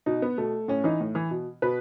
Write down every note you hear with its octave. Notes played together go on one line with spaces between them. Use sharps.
B2 D#4
B3
B2 A3
A2 C#4
E3 D#4
A2
E3
B2
B2 B4